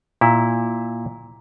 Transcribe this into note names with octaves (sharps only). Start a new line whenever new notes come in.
A#2 E4